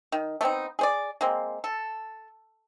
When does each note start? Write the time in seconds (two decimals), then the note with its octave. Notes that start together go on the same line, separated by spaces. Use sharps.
0.12 D#3
0.41 A3 B3 C4 D#4
0.79 G#4 C5 D5
1.21 G#3 A#3 C4
1.64 A4